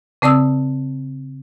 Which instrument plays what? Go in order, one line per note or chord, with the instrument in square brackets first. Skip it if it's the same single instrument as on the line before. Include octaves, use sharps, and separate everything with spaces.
[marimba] C#3 C4 D5 D#6 E6